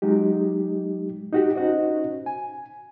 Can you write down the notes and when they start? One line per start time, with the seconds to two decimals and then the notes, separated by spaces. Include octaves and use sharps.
0.02 F#3 G#3 D#4 G4
1.32 D#4 F#4 G4
1.55 C#4 D#4 F#4 C5 D#5
2.26 G#5